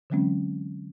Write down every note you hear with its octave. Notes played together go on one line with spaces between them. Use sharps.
D3 E3 F#3 G#3 C4 C#4